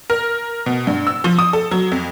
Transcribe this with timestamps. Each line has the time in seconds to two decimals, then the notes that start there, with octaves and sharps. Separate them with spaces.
0.10 A#4
0.66 B2
0.87 G2
1.07 E6
1.24 F3
1.39 D#6
1.53 A4
1.71 F#3
1.92 F2